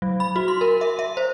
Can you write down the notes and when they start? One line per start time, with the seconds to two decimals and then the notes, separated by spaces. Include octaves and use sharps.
0.02 F#3
0.20 B5
0.36 F#4
0.48 C6
0.61 A#4
0.81 E5
0.99 E5
1.17 C5